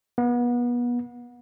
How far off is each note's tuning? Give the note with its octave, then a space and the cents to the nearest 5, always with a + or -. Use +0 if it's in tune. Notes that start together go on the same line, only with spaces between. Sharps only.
B3 -30